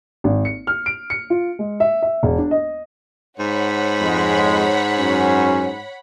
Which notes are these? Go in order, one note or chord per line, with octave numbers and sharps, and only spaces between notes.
G#1
C#7
F6
D7
C#7
F4
G#3
E5
E5
E1
D4
D#5
G#2 C#5 F#5 B5
F2 G#3
F#2 F#3 C#4